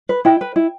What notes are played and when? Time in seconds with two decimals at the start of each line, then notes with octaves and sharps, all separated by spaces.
0.09 B4
0.25 E4 G5
0.41 B4
0.56 E4